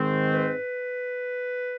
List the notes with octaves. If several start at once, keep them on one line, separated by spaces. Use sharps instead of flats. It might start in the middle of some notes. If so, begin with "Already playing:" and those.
Already playing: G#2 D#3 G#3 C4
B4